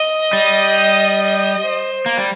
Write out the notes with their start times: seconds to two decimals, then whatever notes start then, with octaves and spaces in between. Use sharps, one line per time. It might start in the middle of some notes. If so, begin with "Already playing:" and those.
Already playing: D#5
0.33 G3
1.63 C5
2.06 A#3
2.18 G3